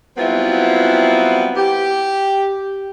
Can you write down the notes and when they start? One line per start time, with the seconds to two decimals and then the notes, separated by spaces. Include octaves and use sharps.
0.18 F#3 G3 B3 C4 E4 F4
1.57 G4